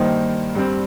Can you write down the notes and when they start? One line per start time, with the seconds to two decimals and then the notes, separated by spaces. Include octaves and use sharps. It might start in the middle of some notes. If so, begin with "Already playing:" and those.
Already playing: G2 D#3 A#3 D#4 C5
0.55 G2 G3 C4